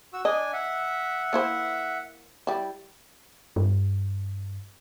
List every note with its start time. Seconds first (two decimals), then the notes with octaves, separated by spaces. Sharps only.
0.13 F#4 E6
0.25 D4 D#5 G#5
0.53 E5 F#5
1.33 A#3 E4 C5
2.47 G3 E4
3.56 G2